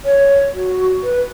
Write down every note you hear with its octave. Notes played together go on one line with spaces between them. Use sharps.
C#5
F#4
B4